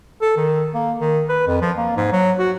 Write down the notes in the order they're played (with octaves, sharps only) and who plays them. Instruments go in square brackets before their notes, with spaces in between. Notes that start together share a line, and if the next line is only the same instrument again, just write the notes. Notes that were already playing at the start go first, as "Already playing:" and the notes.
[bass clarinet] A4
D#3
A#3
D#3
B4
F2
F3
A#3
G#2
F#3
F#4